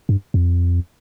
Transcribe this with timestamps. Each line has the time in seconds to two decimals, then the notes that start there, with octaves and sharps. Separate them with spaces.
0.09 G2
0.34 F2